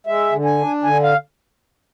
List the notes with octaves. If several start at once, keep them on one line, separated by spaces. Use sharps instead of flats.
G#3 E5
D3
G#5
D4
D3 G#5
F5